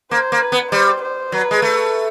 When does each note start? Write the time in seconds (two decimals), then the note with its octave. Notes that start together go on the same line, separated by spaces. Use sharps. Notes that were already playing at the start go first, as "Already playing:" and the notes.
0.11 A#3 C5
0.32 A#3
0.42 B4
0.52 B3
0.72 G3 C5
1.02 C5
1.32 F#3 B4
1.51 G#3
1.62 A3